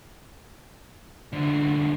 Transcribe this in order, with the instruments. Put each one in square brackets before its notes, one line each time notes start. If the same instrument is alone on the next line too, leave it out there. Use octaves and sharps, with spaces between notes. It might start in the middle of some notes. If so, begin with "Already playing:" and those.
[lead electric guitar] C2 D3